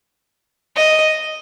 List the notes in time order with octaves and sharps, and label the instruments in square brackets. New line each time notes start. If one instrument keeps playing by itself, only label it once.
[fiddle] D#5